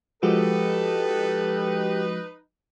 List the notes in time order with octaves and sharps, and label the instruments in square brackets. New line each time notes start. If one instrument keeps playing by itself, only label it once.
[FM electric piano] F3 G#3 F#4 [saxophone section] D#4 B4 [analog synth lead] G4 [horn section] A4